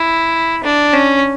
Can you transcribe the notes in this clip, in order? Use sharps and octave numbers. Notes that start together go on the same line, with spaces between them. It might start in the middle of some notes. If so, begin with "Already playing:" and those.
Already playing: E4
D4
C#4